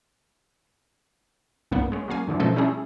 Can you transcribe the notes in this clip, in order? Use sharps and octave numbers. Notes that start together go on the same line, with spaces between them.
C2 G2 A#3 B3
G#3 C#4
C#3 F#3 A#3 F5 G#5
G2 D3 E3 F3
B2 F3 A3 C#4 D#4 A4
G3 C#4 E4 G#4 A4